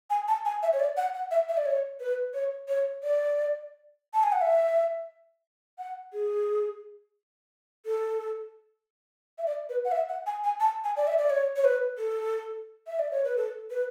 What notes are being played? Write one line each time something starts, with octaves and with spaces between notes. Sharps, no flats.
G#5
A5
G#5
E5
C#5
D5
F#5
F#5
E5
E5
D5
C#5
B4
C#5
C#5
D5
A5
G#5
F#5
E5
F#5
G#4
A4
E5
D5
B4
F#5
E5
F#5
G#5
G#5
A5
G#5
D5
E5
D5
C#5
C#5
B4
A4
E5
D5
C#5
B4
A4
B4